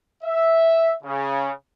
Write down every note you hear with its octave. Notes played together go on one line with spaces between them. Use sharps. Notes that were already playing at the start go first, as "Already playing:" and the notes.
E5
C#3